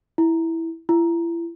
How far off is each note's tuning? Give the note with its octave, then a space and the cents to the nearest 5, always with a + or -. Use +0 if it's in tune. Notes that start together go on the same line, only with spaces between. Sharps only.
E4 -5
E4 +35